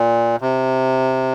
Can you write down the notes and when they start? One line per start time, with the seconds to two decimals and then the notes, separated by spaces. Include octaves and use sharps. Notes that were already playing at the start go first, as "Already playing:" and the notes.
Already playing: A#2
0.41 C3